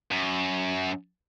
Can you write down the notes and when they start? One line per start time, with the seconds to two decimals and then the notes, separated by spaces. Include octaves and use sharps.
0.11 F#2